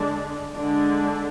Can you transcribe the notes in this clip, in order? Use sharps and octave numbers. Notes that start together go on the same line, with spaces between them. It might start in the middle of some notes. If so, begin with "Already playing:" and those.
Already playing: D3 G#3 D4
D3 G#3 D4